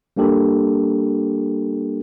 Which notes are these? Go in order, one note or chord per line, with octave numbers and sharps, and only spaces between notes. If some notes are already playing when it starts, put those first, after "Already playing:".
G3 A#3 D4 G4 A4